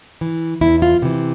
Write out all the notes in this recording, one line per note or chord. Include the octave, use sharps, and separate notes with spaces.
E3
E2 E4
F4
C3 E3